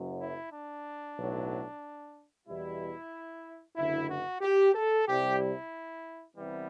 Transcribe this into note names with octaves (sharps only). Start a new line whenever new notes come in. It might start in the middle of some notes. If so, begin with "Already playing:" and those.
Already playing: F#1 F#2 F#3
E4
D4
B1 A2 F#3
E2 B2 G3 E4
F#1 F#2 D3 E4
F#4
G4
A4
C2 C3 G3 G4
E4
C2 C3 E3 G3 B3